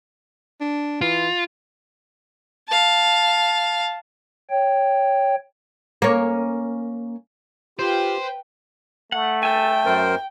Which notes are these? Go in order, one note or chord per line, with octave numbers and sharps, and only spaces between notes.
D4
E3 F4
F5 A5
C#5 G5
A#3 C#4
F4 G4 B4 C5 G5
A3 F#5
A4 E5 G5 G#5
F#2 A#4 C5